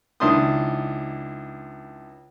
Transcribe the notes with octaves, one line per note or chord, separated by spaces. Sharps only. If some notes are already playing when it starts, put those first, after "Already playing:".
C#2 D#3 D4 E4 C6 D#6